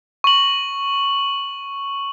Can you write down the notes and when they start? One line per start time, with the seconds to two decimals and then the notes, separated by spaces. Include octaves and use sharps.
0.24 C#6 F#7